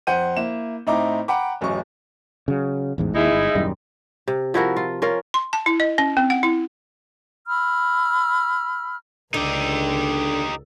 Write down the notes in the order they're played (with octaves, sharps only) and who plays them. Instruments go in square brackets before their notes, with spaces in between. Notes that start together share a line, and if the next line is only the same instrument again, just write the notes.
[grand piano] F2 C5 F#5 G6 D#7
A#3 E4 E7
A2 C4 D#4 E4 A#5 D6
F#5 G5 A#5 B5 D6
D1 A1 F#2 D#5 C#6
[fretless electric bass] C#3 F#3
A1 E2 G#2
[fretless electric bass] D#2 [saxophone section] G#3 D#4 E4
[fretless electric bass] G1
D#1 F#2 G3
[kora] C3
F3 E4 F#4 A#4
F4
C#4 F4 A#4
[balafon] C6
A5
E4
D#5
C#4
C4
F#5
E4
[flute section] B5 E6 F6
[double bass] C#2 [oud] D3 [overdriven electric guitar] D#4 G4